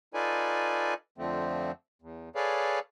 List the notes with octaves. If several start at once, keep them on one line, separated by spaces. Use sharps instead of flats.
D#4 F4 A4 B4 D5 G#5
F2 D3 F3 A3 C4
E2
G#4 A4 B4 C#5 D5 F5